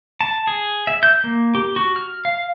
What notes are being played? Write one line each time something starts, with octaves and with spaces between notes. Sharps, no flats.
A5
G#4
E5
G6
A#3
G4
F#4
F6
F5